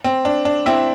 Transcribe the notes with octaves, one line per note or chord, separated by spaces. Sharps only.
C4
D4
D4
C4 E4